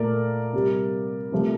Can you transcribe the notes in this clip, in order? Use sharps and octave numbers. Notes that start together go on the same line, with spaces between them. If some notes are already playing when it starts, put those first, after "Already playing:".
Already playing: A#2 A3 A#4 D5
C3 G3
C3 F3 A3